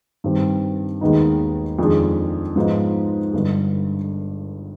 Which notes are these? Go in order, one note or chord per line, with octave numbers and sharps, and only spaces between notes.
G2 D#3 G3 C4
D#2 D#3 G#3 B3 D#4
F2 D#3 G#3 D4 G#4
G#2 F3 B3 D#4
G1 G2 D3